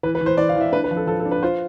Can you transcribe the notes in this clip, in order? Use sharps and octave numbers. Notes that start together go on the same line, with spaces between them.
E3 B4
B4
E3
C5
E3 D5
F5
E3 E5
D4 B4
B4
F3
A4
F3 A4
A4
D4
B4
F4 C5